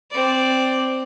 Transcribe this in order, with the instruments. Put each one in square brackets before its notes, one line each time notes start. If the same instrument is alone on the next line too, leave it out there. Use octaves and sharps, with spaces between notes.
[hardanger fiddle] C4 D5